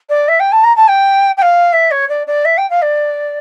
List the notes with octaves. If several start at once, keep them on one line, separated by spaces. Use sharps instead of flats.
D5
E5
G5
A5
A#5
A5
G5
G5
F5
E5
C#5
D5
D5
E5
G5
F5
D5